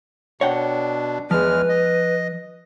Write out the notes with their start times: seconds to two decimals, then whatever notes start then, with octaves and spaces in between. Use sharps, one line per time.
0.41 B2 D4 C#5 F#5 G5
1.31 E2 F3 G#3 B4 F6
1.69 D#5